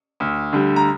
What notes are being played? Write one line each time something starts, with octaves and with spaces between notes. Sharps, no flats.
D2
D3 G3
A#5